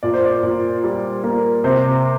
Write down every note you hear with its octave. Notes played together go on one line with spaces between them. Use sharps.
A#2 D5
C5
D5
A#2
G3
A#3
C3 C5